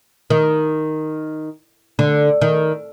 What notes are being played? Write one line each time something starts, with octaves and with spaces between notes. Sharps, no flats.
D#3
D3
D#3